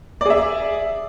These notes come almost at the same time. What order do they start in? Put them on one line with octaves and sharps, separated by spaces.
D5 G#4 E5